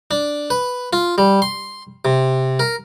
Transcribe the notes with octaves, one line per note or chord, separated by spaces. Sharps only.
D4
B4
F4
G3
C6
C3
A#4